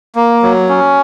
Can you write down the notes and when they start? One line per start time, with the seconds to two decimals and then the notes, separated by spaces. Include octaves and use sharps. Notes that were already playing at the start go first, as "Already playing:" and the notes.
0.15 A#3
0.42 F#3
0.69 C#4